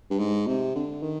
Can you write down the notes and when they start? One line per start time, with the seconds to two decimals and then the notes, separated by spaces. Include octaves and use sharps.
0.10 G2
0.19 G#2
0.47 C3
0.75 D3
1.02 D#3